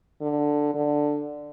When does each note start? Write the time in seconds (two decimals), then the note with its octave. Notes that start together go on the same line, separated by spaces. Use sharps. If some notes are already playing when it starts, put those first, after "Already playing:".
0.21 D3
0.74 D3